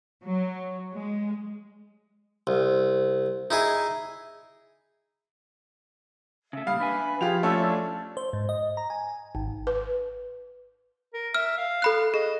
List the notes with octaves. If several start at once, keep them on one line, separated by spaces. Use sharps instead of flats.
F#3
G#3
C2
D#4 E4 G#4
C#3 A3 E5
A#2 G3 F5 B5 D#6
D4 B4 E5 G#5 B5
F3 F4 G4 G#4 F7
A3 C#4 D4 F4 A4 E6
D4 E4
C5
G#2
D#5
A#5
G#5
G#1
B4
A#4
E5 F6
F5
A4 B5 F#6
G#4 D#5